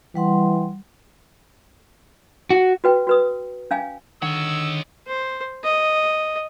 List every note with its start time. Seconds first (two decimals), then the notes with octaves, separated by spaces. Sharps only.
0.15 E3 G3 F#5 C6
2.50 F#4
2.84 F#4 B4 G5
3.07 F#4 B4 D#6
3.71 C#4 F5 G#5
4.22 D3 D#3 C#5 D#5 F#5 E6
5.07 C5
5.64 D#5